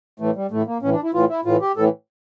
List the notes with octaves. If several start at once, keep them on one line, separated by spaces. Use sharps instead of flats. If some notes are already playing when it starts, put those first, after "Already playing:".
A2 E3 A3
G3
A2 E3 A3
A#3
A2 E3 C#4
D4
E4
A2 E3 F4
E4
A2 E3 F4
G4
A2 E3 A4